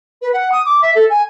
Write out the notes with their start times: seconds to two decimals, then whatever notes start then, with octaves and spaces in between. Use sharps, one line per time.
0.21 B4
0.33 F#5
0.51 D#6
0.65 D6
0.82 E5
0.95 A4
1.09 G#5